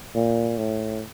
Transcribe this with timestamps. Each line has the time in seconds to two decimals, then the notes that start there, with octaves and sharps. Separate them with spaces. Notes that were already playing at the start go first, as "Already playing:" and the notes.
0.15 A#2
0.58 A2